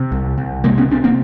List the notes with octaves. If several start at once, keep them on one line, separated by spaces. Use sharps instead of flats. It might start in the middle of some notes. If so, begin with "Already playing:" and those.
Already playing: C3
C2
C2
C3 G#3 A#3
B3 C#4
C3 C4 D4
A#3 C4